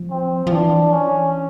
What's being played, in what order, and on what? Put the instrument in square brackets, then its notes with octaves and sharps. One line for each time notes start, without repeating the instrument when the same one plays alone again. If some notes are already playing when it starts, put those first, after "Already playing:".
Already playing: [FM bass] F3
[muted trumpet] C4
[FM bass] F3
[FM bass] E3 [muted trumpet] D4
[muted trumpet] C#4